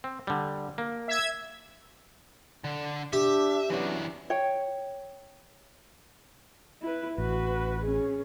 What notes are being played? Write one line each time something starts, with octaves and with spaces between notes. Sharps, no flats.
C4
D3 G3
A#3
E5 G#6
D3
D4 G4 E5
E3 F#3 B3 C#4 D4
C#5 G5
E4 B4
A1 F#4 B4
C#4 G#4